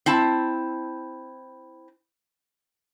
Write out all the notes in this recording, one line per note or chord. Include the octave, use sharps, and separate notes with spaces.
C4 E4 A5